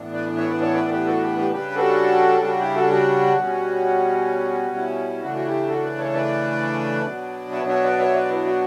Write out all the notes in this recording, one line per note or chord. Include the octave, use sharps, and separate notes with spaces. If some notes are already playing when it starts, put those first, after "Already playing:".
Already playing: A2 E3 B3 D4
B4 D5
C#5 E5
B4 D5
A4 C#5
B4 D5
A4
G4 B4
F#4 A4
G4 B4
G4 B4
C#3 G3 D4 G4 B4
F#4 A4
F#4
E4 G4
F#4 A4
F#4
B2 G3 C#4
E4
C#3 E3 A3 D4 F#4
F#4
E4 G4
F#4 A4
B4 D5
A4 C#5
B4 D5
B2 F#3 B3 D4
C#5 E5
C#5 E5
B4 D5
C#5 E5
B4 D5
E4
F#4